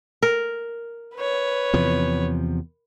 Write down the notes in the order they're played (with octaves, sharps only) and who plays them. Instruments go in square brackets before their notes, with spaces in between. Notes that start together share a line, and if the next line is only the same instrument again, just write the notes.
[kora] A#4
[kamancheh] B4 C#5
[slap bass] E2 C3 F3